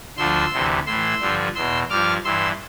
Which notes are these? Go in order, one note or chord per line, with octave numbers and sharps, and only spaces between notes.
D2 D3 F3 C6 E6
D2 C3 E3
A2 E3 C6 E6
G2 D3 F3
E2 B2 C6 E6
G2 F3 D6 F6
G2 E3 C6 E6